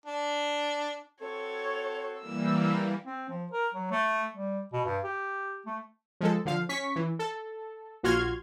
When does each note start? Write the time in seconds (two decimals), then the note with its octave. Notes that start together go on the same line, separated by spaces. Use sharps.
0.05 D4
1.21 C4 F#4 A4 C#5
2.20 E3 G3 A#3 E6
3.06 C4
3.29 F3
3.52 A#4
3.75 F#3
3.91 A3
4.34 G3
4.73 B2
4.85 G2
5.04 G4
5.66 A3
6.21 F3 G#3 A4
6.45 D3 F3 F5
6.69 C#4 C#6 B6
6.96 E3
7.19 A4
8.03 A#1 F4 F#4 C6 F6 G#6